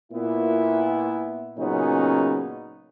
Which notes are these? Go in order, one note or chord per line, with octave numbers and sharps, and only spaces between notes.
A#2 B3 E4
A#2 C#3 F#3 B3 C#4 D#4